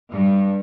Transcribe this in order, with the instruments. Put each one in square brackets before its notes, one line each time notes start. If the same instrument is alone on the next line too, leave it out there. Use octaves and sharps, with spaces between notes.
[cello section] G2